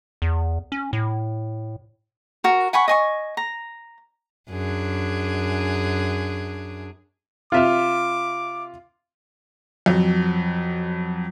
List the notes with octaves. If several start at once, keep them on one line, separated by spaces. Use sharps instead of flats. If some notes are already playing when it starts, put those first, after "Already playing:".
E2
C#4
A2
F#4 A#4
F#5 G#5 B5 C#6
D#5 G#5 C#6
A#5
F#2 D4 G#4
C3 F4 E5 D6 F6
F2 F#3